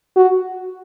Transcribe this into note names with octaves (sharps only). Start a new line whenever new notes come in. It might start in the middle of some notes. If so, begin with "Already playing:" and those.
F#4